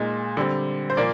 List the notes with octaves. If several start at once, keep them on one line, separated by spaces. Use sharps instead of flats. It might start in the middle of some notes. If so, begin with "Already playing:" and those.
Already playing: A#2 G#3 D#4
D3 G3 C4
C5
A#2 F3 A#3 D5